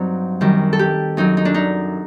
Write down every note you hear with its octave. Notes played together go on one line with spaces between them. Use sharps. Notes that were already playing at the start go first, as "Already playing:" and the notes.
Already playing: G2 F#3 C4 D#4
F#2 D#3 G3
A4
G4
F#2 F#3 D#4
D#4
D4
D#4